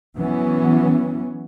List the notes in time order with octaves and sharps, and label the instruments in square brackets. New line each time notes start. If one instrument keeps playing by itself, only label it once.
[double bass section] E3 F#3 B3 C#4